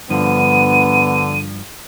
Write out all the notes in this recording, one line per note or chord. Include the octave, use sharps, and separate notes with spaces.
G2 D3 F3 B3 D#7